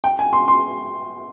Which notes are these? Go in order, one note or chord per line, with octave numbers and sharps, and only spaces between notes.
G5
G#5
C6
C6